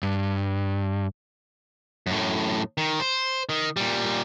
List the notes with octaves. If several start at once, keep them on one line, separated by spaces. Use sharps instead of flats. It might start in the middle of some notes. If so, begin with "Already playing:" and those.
G2
F#2 A2
D#3
C5
D#3
A#2 G3